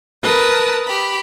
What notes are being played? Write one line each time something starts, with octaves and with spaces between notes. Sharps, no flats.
A#4 B4 A5 D#6
G4 B5